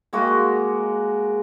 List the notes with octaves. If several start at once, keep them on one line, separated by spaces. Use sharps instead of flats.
G#3 A#3 F#4 D#5